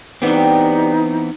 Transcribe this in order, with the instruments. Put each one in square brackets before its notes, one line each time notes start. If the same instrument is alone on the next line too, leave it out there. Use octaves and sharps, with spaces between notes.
[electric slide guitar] E3 B3 C4 [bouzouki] G3 G4 [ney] D#4